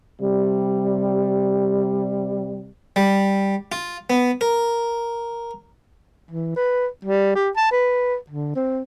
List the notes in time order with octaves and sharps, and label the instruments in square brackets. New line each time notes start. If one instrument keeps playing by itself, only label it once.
[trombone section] C3 G3
[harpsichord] G3
F4
B3
A#4
[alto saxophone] E3
B4
G3
G4
A5
B4
D3
C4